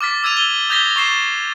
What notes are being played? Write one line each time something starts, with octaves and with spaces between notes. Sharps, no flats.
D6 F6 A6 B6
D6 E6 G#6 A6 D#7 F7
G7
D#6 G6 G#6 A#6 B6 G7
C#6 A6 C7 E7